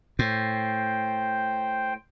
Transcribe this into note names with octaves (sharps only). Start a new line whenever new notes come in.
A2 C5 G5